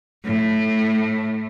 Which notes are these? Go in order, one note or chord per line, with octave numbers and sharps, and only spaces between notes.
A2